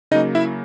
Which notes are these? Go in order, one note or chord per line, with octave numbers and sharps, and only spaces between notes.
C#3 F#3 A#3 D#4 D#5
E4 E5